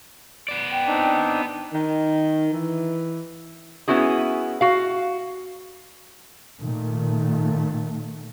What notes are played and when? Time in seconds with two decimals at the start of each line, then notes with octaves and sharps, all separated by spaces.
0.48 B3 D5
0.72 G5
0.87 C4 D4 D#4
1.72 D#3
2.53 E3
3.88 B3 C#4 E4 F#4 G#4
4.61 F#4 F5
6.60 A#2 D#3 A3